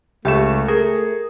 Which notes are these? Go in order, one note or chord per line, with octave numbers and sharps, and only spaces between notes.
C#2 A3 G4 E5 C#6 E7
G#4 A#4